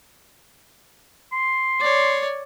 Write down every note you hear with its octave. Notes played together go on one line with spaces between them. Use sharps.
C6
C#5 D5